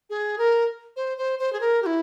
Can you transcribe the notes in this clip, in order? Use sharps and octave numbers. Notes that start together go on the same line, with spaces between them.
G#4
A#4
C5
C5
C5
G#4
A#4
G4
E4